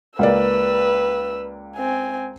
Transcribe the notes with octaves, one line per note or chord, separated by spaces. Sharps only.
C#2 A#3 B4 D5 E6
C4 G#5